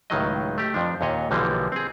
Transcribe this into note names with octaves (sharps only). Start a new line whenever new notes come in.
C#2 A2 D#3 F#3 D#5
A3 G4
F2 F3 D4
D#2 A#2 C#5 D#5
B1 D3 E3 F3 G3 A#3
C4 G#4